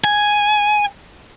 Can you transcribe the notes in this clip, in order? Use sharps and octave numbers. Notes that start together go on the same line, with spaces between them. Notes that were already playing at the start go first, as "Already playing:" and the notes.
G#5